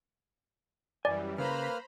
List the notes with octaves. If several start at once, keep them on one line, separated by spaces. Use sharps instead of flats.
F#2 E3 G3 D5 G#5
C#3 A#3 B4 C5 A#5 B5 F6